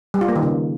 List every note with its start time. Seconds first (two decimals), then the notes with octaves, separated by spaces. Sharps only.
0.14 G3
0.21 F4
0.28 A#3
0.36 D#3
0.43 C#3